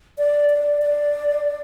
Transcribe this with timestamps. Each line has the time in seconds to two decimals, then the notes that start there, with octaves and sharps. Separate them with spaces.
0.18 D5
0.50 D5
0.82 D5